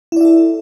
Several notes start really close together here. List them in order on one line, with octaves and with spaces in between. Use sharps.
E4 D5 E5 A4